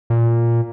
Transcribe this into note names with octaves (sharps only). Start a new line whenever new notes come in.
A#2